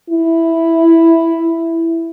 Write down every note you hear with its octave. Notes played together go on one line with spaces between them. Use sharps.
E4